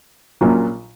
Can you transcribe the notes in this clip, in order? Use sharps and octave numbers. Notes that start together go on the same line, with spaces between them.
A#1 A#2 F#3 C#4 F4